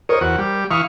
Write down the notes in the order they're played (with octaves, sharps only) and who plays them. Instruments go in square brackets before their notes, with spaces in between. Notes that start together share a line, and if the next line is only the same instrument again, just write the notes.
[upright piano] A#4 C5 [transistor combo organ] C#5 D#5
[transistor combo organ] E2 F#4
G3
[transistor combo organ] E3 F5 C#6 [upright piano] D#6